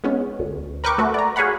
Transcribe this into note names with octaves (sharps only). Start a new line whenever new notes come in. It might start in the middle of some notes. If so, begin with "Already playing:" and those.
G#3 B3 C#4
D2
A#4 B4 G5 C#6 D6
A3 F#4 B4
D5 A#5
F#4 G#4 C#5 F5 F#5 B5